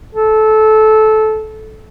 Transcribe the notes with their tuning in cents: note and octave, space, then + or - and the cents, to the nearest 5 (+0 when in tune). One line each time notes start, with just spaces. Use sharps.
A4 -20